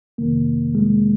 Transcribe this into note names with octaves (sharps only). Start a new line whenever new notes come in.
F2 C3 D#3 A#3
G#3